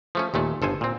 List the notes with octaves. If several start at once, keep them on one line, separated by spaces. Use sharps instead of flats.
F3 A3 C#4
D#2 A#2 A3
G1 A4 C5 G#5
A#2 C4